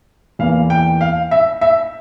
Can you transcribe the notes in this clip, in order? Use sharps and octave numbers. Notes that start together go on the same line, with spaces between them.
E2 E3 A#3 F5
G5
F5
E5
E5